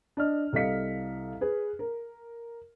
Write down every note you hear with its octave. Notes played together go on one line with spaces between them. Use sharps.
D4 D#5 F6
C2 A4 D#5 F5 B6 C#7
G#4 B4
A#4